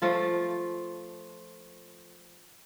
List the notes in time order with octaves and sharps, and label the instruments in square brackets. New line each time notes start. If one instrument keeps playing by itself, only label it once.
[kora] F3 A3 F4